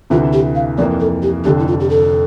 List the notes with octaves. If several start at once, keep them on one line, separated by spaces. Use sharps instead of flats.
D2 C3 E3 F4
G4
F5
F2 E3 A#3 D5
A4
G4
F1 F2 D3 G4
E4
F4
G4
A4